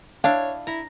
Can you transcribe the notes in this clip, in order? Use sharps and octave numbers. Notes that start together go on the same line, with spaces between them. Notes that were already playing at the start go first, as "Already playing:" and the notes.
D4 E4 C#5 F5
E4 A#5